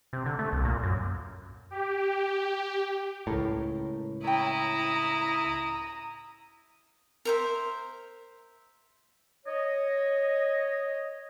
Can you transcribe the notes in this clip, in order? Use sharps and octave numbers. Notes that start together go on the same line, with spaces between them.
C3
D3
A3
C2
A#2
F#2
G4
C#2 A2 A#4
E4 C#5 G5 A#5 D#6
A#4 C5 E5
C#5 D#5